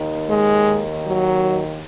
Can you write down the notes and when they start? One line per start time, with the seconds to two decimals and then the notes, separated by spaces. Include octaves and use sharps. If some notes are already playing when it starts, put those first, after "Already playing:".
Already playing: D#2 D#3
0.26 G#3
1.04 F#3